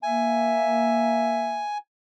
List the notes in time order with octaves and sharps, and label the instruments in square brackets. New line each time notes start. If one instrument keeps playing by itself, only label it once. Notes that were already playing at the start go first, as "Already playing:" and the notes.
[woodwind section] A#3 E5 [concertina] G#5